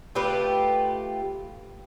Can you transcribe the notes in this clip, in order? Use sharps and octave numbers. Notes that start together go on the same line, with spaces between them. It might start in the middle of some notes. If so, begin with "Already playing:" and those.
A3 F4 G4 B4